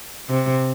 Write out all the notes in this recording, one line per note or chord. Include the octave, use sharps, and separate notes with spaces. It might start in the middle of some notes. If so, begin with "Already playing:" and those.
C3